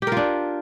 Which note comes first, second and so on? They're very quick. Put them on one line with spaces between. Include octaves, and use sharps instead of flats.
G4 A#4 F4 D4